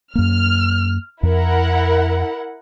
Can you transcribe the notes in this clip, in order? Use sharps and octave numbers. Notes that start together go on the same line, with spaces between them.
F#2 A#3 F6
F2 E4 A#4 F#5